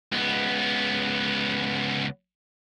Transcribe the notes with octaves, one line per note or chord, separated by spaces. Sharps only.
C#2 B3